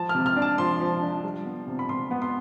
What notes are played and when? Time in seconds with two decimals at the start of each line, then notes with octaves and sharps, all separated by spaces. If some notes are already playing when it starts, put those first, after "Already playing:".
Already playing: F3 A5
0.09 F6
0.15 C3
0.26 F6
0.36 D4
0.42 A5
0.58 F3 C6
0.80 F3
1.02 D4
1.24 G3
1.46 B3
1.67 C3
1.79 B5
1.89 C3 C6
2.11 B3
2.22 C6